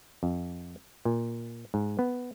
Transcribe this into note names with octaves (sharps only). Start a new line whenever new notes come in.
F2
A#2
G#2
B3